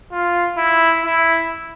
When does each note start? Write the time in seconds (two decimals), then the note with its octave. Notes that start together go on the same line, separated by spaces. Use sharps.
0.12 F4
0.57 E4
1.05 E4